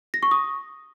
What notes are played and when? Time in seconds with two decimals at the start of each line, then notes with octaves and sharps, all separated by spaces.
0.14 A#6
0.23 C#6
0.31 D#6